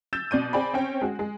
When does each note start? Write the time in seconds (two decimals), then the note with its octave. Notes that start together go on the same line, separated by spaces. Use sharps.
0.13 E6 G6 A6 E7
0.31 B2 D5 G6 D#7
0.53 C4 G#4 D5 G5 G#5 B5
0.74 C4 C#4 G5
1.02 G#3 F#4
1.19 G#3